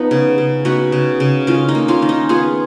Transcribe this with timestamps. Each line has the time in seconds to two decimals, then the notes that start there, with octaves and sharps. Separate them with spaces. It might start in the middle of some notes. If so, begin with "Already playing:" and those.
Already playing: F3 B3 D#4
0.11 C#3
0.38 C#3
0.65 B3 D#4 F#4
0.92 C#3
1.20 C#3
1.47 D#3 C#4 F4
1.69 D#4
1.75 A#3
1.88 C#4 F4
2.02 D#3
2.09 D#4
2.29 B3 F4 G#4